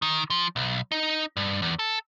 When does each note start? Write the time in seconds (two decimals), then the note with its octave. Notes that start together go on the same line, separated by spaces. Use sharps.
0.02 D#3
0.30 F3
0.56 B1
0.92 D#4
1.37 G2
1.62 E2
1.79 A4